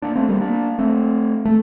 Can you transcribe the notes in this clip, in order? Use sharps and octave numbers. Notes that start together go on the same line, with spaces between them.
A#3 D4
A3 C4
G3 A#3
A#3 D4
A3 C4
A3